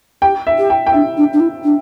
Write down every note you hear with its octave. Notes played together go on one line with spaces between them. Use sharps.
G4 G5
E5
G4
G5
G5
D4 E5
D4
D4
E4
D4